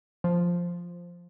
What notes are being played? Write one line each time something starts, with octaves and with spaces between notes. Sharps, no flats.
F3